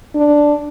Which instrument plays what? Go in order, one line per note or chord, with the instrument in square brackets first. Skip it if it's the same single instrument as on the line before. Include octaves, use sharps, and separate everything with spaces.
[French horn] D4